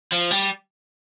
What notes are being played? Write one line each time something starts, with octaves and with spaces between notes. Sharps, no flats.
F3
G3